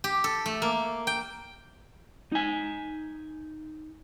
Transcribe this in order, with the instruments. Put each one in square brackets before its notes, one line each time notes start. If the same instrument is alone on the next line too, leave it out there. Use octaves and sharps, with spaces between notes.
[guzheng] G4
A4
A3
A#3
G5
[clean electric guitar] D#4 G#5